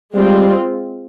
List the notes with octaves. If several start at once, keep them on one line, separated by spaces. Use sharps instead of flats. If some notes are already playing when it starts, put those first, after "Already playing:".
G3 G#3 C4 F4